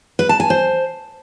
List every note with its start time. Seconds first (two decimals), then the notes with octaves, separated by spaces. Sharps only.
0.19 B4
0.29 A5
0.40 G#5
0.50 C5